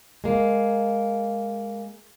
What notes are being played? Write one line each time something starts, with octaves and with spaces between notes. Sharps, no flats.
G#3 A#3